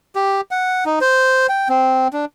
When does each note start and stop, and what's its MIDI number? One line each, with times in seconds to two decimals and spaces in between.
0.15 0.41 67
0.51 0.84 78
0.85 0.99 63
1.01 1.47 72
1.49 1.68 79
1.69 2.08 60
2.13 2.25 62